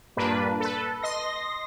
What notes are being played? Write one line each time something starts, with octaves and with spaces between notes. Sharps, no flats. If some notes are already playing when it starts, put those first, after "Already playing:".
G2 A#2 A#3 D4 B4
A4 B4
D#5 C6 A#6